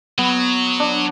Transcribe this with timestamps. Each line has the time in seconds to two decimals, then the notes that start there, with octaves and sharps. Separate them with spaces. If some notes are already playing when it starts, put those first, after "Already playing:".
0.18 F#3 B3
0.80 D4